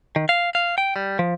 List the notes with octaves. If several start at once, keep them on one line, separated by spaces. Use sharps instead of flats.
D#3
F5
F5
G5
G3
F3